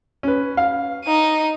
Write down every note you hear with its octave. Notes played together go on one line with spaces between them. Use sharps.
C#4 B4
F5
D#4 D#7